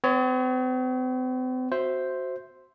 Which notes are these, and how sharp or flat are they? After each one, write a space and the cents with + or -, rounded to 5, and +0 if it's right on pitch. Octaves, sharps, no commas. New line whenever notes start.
C4 -45 C#5 +10
F#4 +0 C5 +0 E5 +0